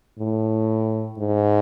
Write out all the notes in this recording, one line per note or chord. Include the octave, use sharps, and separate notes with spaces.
A2
G#2